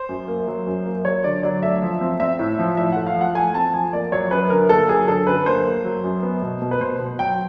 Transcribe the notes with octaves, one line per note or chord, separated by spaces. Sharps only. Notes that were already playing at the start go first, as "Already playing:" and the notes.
Already playing: C5
F#2
A#3
F#3
F#2
A#3
F#3 C#5
D3 D5
F#3 D5
A3 E5
F3
C4
C4 E5
A2
F3
A2 E5
A3 F#5
F5
F3
F#5
A3 G#5
C4 A5
F3 G#5
A#3 D5
F#3 C#5
F#2 B4
D3 A#4
A#3 A4
F#3 G#4
D3 A4
F#2 B4
A#3 C5
A#3
F#3
F#2
B3
B2
B2
B4
B2 C5
B2
F#3 G5